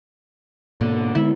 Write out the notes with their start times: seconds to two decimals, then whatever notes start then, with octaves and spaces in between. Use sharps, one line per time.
0.81 G#2 B2 D3 A#3
1.15 D3 G#3 B3 E4